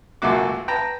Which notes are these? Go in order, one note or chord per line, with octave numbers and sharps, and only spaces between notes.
C#2 F#2 A3 A#3 F#4 D6
B4 G5 A5 A#5